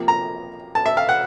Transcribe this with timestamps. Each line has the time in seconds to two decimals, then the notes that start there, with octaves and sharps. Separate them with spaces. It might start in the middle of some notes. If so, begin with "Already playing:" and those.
Already playing: C3 F3 A#3
0.08 A#5
0.75 A5
0.86 E5
0.97 F5
1.09 F#5